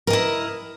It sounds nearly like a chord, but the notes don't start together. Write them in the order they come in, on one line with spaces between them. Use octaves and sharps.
A#4 D#5 E4